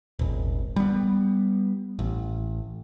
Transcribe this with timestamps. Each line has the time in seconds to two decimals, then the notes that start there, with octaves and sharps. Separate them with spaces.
0.19 D#1 G#1
0.76 G3 B3
1.99 A1